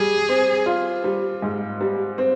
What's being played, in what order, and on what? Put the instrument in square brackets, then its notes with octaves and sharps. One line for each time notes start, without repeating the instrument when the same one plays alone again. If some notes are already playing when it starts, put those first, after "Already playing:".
Already playing: [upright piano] G3 [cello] G#4
[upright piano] C4
F4
G3
G#2
G3
C4